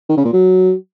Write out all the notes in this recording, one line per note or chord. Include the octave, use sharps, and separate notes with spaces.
D#3
C#3
A#2
F#3